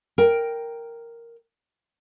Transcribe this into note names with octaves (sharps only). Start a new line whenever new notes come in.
A#4 G5